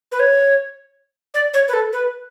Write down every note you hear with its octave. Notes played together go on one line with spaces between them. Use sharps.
B4
C#5
D5
C#5
B4
A4
B4